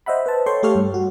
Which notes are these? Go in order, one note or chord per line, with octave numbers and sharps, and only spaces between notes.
C5 D#5 E5 F#5 B5
B4 C5 A5
A4 C#5 G5 C6 C#6
A3 G4 A4 C#5 F5 F6
G2
F#4